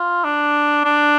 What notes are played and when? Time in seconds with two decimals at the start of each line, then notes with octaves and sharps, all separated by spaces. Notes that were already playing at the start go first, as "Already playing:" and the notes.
Already playing: F4
0.24 D4
0.84 D4